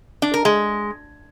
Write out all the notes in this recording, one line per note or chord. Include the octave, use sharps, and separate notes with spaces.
D4
A#4
G#3